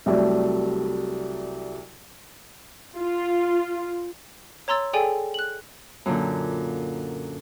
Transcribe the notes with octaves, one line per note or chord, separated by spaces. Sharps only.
C2 F#3 G3 A3 D5
F4
C#5 A#5 C6 E6 A6
G#4 A4 D5 G5 G#5
F#6 F#7
F#2 A#2 D3